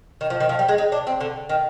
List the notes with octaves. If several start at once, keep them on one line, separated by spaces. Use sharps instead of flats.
D#3
F3
D#3
F3
G3
G#3
D#4
D4
C4
D3
D#3